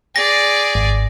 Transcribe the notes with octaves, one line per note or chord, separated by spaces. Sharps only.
G#4 D5 A#6
G#1